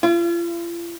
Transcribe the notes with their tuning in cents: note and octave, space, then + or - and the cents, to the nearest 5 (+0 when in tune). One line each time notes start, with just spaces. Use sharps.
F4 -40